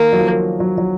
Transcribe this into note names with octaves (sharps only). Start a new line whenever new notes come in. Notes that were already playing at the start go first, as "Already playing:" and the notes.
Already playing: D#3 A#3
F#3
F3
F#3
F#3